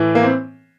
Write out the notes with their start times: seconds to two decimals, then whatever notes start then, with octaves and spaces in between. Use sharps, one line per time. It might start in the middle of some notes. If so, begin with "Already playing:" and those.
Already playing: A2 E3
0.15 A#3
0.23 C4